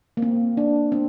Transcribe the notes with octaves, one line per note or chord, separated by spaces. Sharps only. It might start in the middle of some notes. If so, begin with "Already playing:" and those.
A#3
C4
D4
C4